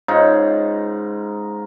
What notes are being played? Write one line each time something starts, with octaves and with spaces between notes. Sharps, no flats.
G#2 C#3 D#4 F4